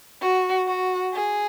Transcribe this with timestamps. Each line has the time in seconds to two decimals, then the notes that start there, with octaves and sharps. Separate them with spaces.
0.21 F#4
0.67 F#4
1.13 G#4